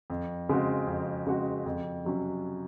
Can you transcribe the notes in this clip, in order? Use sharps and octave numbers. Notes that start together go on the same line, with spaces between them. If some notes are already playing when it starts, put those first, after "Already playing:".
F2
C#3 G#3 C4 F#4
F2
C#3 G#3 C4 F#4
F2
C3 F#3 C#4